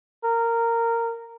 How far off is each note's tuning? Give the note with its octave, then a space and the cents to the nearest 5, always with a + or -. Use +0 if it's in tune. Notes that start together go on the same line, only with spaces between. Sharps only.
A#4 -15